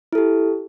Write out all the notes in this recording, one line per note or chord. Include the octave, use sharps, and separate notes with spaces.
E4 G4 A4